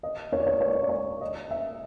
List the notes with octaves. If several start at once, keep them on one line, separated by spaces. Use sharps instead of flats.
D#5
C#5
D5
C#5
D5
C#5
D5
C#5
D5
C#5
D#5
E5